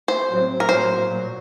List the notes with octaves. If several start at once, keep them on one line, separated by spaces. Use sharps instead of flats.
C5
A2 F#3 C4
A#4
A2 F#3 A#3 C5
A#2 F#3